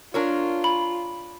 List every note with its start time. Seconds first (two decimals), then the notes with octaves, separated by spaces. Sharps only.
0.14 D4 F4 A#4 C#5
0.64 B5